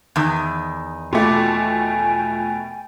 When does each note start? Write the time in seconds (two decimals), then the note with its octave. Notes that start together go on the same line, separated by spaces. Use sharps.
0.16 E2 D#3
1.13 B2 A3 F4 G5 G#5 D6